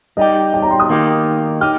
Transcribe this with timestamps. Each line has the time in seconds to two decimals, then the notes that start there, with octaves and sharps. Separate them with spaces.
0.17 G3 D#4 G4 D#5
0.54 G5
0.62 A#5
0.71 C6
0.80 D#6
0.89 D#3 A#3 D#4 G4
1.61 D#4 G4 F6